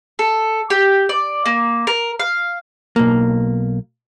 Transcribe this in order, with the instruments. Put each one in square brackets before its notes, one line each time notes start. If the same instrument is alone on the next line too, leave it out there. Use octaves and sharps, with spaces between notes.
[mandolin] A4
G4
D5
A#3
A#4
F5
[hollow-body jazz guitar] B1 A#3